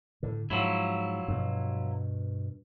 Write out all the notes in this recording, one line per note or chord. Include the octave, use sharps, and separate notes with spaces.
A2 D3
G#2 F3 F#3 E4
G2 B2